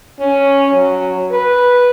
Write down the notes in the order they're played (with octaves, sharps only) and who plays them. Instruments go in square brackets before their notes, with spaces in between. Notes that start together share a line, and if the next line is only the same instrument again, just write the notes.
[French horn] C#4
F#3
B4